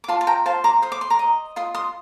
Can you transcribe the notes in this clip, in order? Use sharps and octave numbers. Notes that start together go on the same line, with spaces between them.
D6
F4 A5 C6
A5
G5 A#5
C5 F5 A5
A#5 D6
C5 D#6
D6
C6
A#5 D6
D#5
F4 C6 D#6
C6 D#6